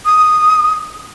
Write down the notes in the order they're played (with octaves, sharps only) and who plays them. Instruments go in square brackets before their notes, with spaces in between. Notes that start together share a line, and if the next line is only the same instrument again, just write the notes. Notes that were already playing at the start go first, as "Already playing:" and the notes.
[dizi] D#6